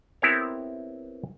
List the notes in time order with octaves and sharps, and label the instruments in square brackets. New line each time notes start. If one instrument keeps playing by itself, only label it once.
[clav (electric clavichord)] B3 C4 E4 G4 A#4 C#5